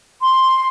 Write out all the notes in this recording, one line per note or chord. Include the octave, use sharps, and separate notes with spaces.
C6